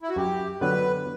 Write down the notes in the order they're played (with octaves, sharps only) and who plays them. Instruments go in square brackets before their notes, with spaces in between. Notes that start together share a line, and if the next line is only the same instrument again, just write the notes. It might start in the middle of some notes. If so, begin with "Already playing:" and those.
[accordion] E4
F#4
[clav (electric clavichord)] F#2 [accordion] G4
[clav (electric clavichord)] D3 F#3 B3 [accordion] B4